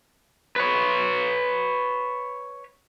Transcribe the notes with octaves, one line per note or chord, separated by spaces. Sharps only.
B4 C#5